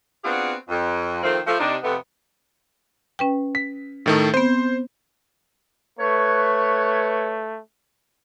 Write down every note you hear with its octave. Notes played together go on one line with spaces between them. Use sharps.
B3 C4 D4 F4 F#4 G#4
F2
D#3 F3 A3 A#3 C4
F3 A3
C3 D4 D#4
F2 C3 A3 B3
C#4 B4 G5
B6
A2 D#3 A3
B3 C4 C5
A3 B4 C#5